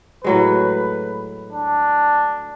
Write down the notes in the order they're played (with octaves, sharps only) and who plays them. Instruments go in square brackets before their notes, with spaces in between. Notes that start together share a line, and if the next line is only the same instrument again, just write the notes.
[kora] A2 F#3 G#3 [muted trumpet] B4
[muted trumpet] D4